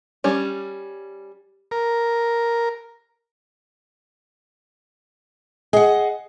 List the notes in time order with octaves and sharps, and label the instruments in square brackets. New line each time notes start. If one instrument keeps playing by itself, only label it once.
[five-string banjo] G3 C#4
[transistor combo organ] A#4
[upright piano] G#4 [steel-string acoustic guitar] D#5 F#5